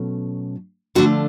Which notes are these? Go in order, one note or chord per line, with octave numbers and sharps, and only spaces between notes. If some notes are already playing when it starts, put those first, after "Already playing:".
Already playing: B2 F#3 A3 C#4
D3 F3 A3 D4 F#4